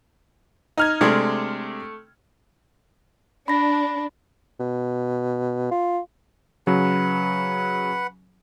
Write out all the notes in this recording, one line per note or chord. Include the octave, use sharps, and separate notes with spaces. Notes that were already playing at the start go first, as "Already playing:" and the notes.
D#4 F6 G#6
C3 G#3 A3 D4
D4 B5 A#6
B2
F4
C#3 F#3 B4 F#5